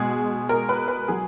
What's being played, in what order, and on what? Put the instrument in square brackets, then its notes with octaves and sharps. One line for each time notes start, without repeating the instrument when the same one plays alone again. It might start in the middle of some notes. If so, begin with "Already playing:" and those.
Already playing: [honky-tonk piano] B2 G#3 G#4
A#4
B4
B4
F#3 G#4